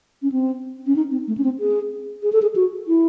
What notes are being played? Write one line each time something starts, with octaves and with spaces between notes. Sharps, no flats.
C#4
C4
C#4
D#4
C4
A3
C#4
C4
G#4
G#4
A4
G#4
F#4
E4